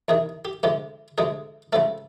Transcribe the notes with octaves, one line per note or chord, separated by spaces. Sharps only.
E2 C3 D#3 G#4
G4
D2 C3 F3 G#3 G4
D2 C3 F3 G#3 G#4
C#2 C#3 F3 A3 A4